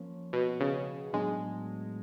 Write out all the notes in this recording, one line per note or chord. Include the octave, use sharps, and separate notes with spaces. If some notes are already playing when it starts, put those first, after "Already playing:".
Already playing: F3 A#3 C#4
B2
C#3
A2 F#3 G#3 B3 D4